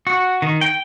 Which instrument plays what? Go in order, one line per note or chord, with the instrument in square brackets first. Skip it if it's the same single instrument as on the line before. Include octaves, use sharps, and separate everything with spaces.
[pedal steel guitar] F#4
D#3
G5